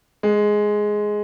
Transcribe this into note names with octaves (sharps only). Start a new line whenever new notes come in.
G#3